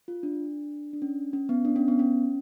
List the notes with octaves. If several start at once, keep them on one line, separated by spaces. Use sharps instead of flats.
F4
D4
D4
C#4
C#4
B3
D4
C#4
B3
C#4